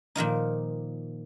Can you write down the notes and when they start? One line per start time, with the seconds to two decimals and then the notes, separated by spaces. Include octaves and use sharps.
0.15 A#2 D#3 F3 D#4